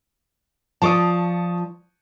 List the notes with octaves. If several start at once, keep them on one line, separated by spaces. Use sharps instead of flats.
F3 F4 D5 A5 C#6 D#6